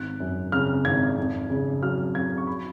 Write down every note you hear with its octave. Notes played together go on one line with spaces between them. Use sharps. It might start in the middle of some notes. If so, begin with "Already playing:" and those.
Already playing: G#1 F#6
F#2
C#3 F6
G#1 G#6
F2
C#3
F#3 F6
F2 G#6
C#6
B5